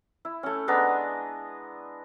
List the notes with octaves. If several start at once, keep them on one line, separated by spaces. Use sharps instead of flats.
E4
A3 C#4
G#3 B3 D4 A#5